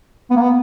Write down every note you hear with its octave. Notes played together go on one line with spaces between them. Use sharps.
B3
A#3
B3